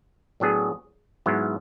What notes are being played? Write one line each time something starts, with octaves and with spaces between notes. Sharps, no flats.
A2 F#3 B3 D4 G#4
G#2 F#3 B3 E4